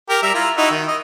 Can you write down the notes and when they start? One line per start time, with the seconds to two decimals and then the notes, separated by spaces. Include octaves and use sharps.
0.09 G4 A#4
0.23 G3 E5 A#5
0.34 E4 F4 A#5
0.57 D#4 E4 F#4
0.71 D#3
0.88 D#5